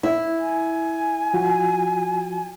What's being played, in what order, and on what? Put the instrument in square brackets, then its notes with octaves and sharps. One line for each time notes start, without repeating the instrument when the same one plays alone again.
[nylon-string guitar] E4
[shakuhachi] G#5
[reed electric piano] F3 F4 F#4